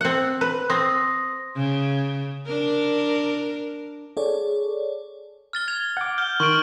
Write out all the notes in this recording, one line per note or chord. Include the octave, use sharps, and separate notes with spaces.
C4 F#5
B4
C4 C6 D#6 A#6
C#3
D4 A#4
G#4 A4 C#5 D5
F6 A6 G7
G#6 F7
F#5 D6
F6 G6 G7
D#3 C6 C#6 F6 D7